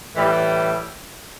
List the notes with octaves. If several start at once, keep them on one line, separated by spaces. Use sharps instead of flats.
A2 E3 G3